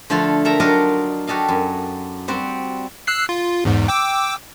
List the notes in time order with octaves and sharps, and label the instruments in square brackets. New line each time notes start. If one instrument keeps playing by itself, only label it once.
[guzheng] D3 F3 A3 F4 A4
A4 A#4 E5 G5 A#5
F#3 D4 D#4 F4 A#4 D#5
F#4 G4 A4 D#5 F5
F#2
G3 C4 F#4
[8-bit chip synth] E6 F#6 C7
F4
E2 G#2
G5 D6 E6